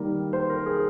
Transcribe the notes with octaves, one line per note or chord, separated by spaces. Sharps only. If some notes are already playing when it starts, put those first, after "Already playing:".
Already playing: D#3 G3 A#3 A#4
C5
A#4
G#4